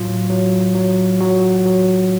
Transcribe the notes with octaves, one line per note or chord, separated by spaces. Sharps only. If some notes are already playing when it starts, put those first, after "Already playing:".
Already playing: A2 F#3 F4
F#3
F#3
F#3 F#4
F#3